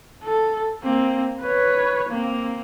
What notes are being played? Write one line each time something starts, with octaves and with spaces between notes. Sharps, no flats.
A4
A#3 C4
B4 C#5
A#3 C4